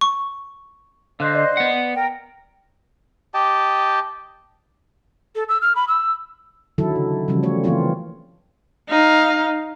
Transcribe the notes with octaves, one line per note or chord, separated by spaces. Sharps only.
C#6
D3 C5 D#5 F5 F#6
D5
B3 F#5
A#4 G5
G4 D#5 G5 A5
A4
E6
F6
B5
E6
D3 D#3 F#3 E4 A4
C#3
C#3 E3 F3 G3 C#4
A3 C#5
E3 A#3 C4 F4 C#5
D#4 F5